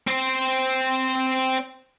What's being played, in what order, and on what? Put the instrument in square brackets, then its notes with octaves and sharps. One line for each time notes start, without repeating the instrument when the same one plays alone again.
[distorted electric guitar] C4 C5